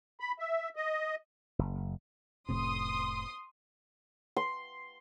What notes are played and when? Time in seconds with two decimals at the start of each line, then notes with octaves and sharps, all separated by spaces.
0.20 B5
0.39 E5
0.76 D#5
1.59 F#1
2.49 F1 A2 C3 C6 D#6
4.37 C6